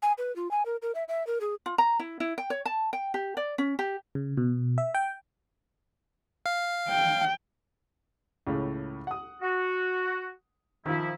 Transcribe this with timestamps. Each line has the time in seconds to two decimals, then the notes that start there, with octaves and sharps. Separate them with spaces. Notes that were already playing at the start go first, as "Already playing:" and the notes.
0.02 G#5
0.18 B4
0.36 F4
0.51 G#5
0.65 A#4
0.82 A#4
0.95 E5
1.08 E5
1.27 A#4
1.41 G#4
1.66 F4
1.78 A#5
1.99 E4
2.20 E4
2.38 G5
2.50 C#5
2.65 A5
2.93 G5
3.14 G4
3.37 D5
3.58 C#4
3.79 G4
4.15 C#3
4.37 B2
4.78 E5
4.94 G5
6.46 F5
6.89 G5
8.47 C#2 A2 C#3
9.07 F#5 D#6
9.41 F#4
10.86 D#3 F3 E4 F4